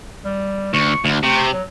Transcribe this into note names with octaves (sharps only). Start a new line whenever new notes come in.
G3
D2 C#6
D2
C3 A3
F#3